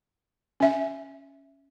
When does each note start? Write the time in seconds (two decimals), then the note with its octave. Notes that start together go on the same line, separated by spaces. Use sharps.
0.60 C#4 E5